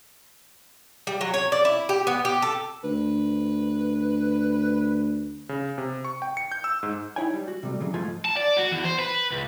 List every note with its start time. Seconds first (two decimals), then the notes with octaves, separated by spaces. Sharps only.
1.07 G3
1.21 F#3
1.34 C#5
1.52 D5
1.65 E4
1.89 G4
2.07 B3
2.25 G4
2.42 A4
2.84 D2 B4
5.49 C#3
5.78 C3
6.05 C#6
6.22 G5
6.37 C#7
6.52 G6
6.64 E6
6.83 G#2
7.16 D#4 E4 C#5 G5 G#5
7.33 G3
7.48 F#4
7.63 C3 G3 A3
7.80 C#3 E3 F#3
7.94 G#2 F3 A3 F4 A4 G#5
8.25 A5
8.37 D5
8.57 F#4
8.72 E2
8.84 C5
8.99 B4
9.32 C#2